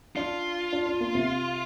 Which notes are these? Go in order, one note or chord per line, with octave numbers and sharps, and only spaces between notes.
D4 F4
D4
D4
A#3
C3